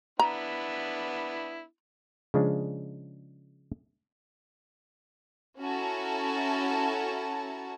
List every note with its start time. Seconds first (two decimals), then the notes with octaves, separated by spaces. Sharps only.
0.19 B3 D4 E4 A#5
2.34 C#3 F3 G#3 D4
5.60 C#4 E4 F#4 A4 A5 A#5